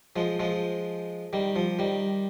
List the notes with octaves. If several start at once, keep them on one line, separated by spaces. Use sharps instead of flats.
F3 G#3
F3 G#3
D#3 G3
F3
D#3 G3